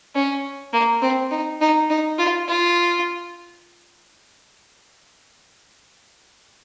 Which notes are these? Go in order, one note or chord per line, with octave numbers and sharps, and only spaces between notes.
C#4
A#3
C4
D#4
D#4
D#4
F4
F4